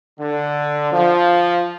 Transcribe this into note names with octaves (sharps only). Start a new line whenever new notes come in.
D3
F3